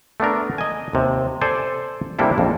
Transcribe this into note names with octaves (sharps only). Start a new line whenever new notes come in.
A3 B3 D4 A#4
D#5 G#5
D#2 C3
A4 C5 D5 G#5
C3 G3 A#3 D4 E4 A4
A#1 F2